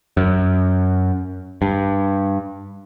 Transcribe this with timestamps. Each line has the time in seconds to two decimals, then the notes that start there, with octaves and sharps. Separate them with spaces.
0.17 F#2
1.62 G2